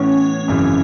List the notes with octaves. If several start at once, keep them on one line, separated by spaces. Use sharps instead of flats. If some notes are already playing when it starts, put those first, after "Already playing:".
Already playing: A2 E3 B3 C#4
G#1 F#2 C#3 E3